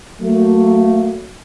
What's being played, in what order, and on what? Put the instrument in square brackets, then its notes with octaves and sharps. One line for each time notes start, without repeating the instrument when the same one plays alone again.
[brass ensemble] F#3 A3 A#3